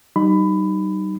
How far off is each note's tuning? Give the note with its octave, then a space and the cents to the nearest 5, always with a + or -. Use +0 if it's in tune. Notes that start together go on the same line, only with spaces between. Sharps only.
G3 -40 D#4 -20 B5 +20